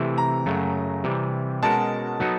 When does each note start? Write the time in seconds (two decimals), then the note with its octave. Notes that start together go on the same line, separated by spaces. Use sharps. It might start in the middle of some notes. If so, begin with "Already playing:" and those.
Already playing: C3 E3 A3 C4 E4
0.18 A#5
0.46 F#2 C#3 F#3 A3
1.04 C3 E3 G3
1.63 B2 G#3 C#4 F#4 A#4 A5
2.20 F#3 B3 D#4 F#4 A4